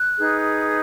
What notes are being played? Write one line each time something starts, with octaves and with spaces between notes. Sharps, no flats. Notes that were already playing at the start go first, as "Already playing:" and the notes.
Already playing: F#6
D#4 G#4 B4